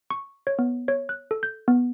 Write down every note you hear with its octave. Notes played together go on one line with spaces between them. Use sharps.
C#6
C#5
B3
C#5
F#6
A4
G6
B3